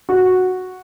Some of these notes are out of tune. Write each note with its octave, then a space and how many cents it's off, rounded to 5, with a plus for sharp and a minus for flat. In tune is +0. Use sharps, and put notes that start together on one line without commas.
F#4 -5